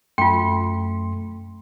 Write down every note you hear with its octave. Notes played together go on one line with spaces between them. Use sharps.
F#2 A3 F4 G5 C6